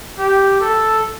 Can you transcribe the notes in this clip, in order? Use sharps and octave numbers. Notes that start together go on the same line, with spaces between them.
G4
A4